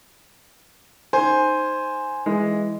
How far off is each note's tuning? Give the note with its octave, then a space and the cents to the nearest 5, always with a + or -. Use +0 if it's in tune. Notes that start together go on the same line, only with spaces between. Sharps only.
D#4 +0 C5 +0 G#5 +0
E3 +0 G#3 -5